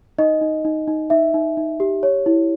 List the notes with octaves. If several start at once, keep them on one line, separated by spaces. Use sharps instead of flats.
D#4 D#5
D#4
D#4
D#4
D#4 E5
D#4
D#4
G4
C#5
E4